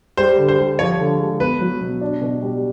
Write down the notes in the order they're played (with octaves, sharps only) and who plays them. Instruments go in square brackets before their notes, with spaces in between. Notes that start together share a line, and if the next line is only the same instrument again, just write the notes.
[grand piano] G3 [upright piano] C5
[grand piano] D3
[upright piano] C5
[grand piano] G3
[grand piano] F3 [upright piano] C#5
[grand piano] D3
G#3
[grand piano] B3 [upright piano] B4
[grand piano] F#3
B2
D4
B2
G3